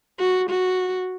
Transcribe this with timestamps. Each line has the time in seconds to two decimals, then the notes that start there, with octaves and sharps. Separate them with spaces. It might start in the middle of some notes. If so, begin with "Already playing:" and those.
0.19 F#4
0.50 F#4